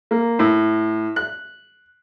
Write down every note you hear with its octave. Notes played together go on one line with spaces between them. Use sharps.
A#3
A2
F#6